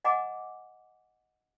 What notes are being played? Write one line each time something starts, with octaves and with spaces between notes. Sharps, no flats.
D#5 F#5 G#5 A#5 D6